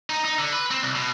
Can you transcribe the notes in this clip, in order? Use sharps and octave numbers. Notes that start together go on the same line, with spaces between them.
D#4
D#4
D3
B4
C4
C2
B2